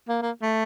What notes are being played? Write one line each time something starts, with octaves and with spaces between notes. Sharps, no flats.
A#3
A#3
A3